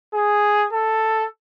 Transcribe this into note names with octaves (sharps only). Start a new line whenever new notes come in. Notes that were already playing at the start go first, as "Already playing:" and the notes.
G#4
A4